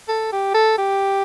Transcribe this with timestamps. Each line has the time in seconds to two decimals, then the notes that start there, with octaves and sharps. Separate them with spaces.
0.08 A4
0.32 G4
0.55 A4
0.78 G4